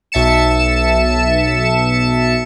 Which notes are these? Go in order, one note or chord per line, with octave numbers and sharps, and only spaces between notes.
B1 E5 A5 C#7 E7